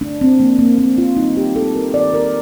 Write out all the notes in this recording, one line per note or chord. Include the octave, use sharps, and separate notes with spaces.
A3 D4
C4
F3 A#3
A#3
A#3 C4
F4
G3 D#4
G4
A3 A4
A#4
D#3 D5
A#4